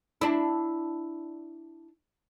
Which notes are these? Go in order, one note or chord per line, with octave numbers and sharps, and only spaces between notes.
D4 E4